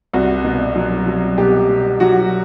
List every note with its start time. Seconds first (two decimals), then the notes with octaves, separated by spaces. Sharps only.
0.14 C2 F#4
0.44 B2
0.76 F#3
1.07 F#3
1.38 B2 G4
1.69 B2
2.00 F#3 F#4